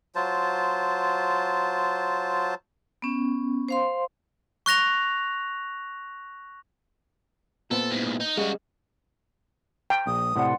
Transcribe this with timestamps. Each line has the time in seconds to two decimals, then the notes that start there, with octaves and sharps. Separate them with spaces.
0.15 F#3 F4 C5 A5
3.02 B3 C#4
3.69 C5 F5 C6
4.66 C#6 F#6 A#6 F7
7.71 A#2 B3 C4 A4
7.91 E2 G#2
8.20 D#4
8.38 C#3 G3 G#3 F#4
9.90 G5 A#5
10.07 A#1 D#6
10.36 A2 C3 D5 F#5 C6